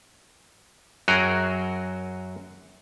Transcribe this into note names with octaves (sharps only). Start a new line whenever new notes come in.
F#2 F#3 F#4 G#4 A#4 G5